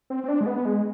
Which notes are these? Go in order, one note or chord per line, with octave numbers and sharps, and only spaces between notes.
C4
C4
D4
G#3
B3
G#3